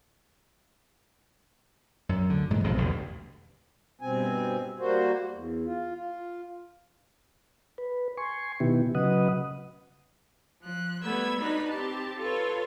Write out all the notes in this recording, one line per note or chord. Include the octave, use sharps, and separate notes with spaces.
F#2
D2 D3
G#2 E3 A#3
B1 F2 D#3
A1 E2 B2 D3
G2 B2 C4 G#5
G3 A#3 F#4 C5
E2
F4
F4
B4
G#5 C6 C#6
B2 D#3 B3 E4 G4
C#3 F#3 B4 D#5 F#5 D#6
F3 F#6
G3 A3 B3 B4 E6 G#6
D4 D#4 F#4 B4 B5
C4 G4 A5
F4 A4 B4 C#5